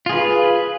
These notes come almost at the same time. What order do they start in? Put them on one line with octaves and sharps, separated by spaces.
F4 G#4 B4